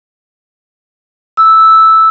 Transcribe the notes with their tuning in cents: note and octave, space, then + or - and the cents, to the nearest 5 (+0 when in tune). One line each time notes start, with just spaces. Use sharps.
E6 -5